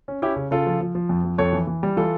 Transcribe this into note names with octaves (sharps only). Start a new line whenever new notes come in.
C#4
C#4 E4 G4
C#3
C#3 F4 A4
F3
F3
F3
F2
F3
F2 A4 C#5
E3
E3
G3
E3 F4 A4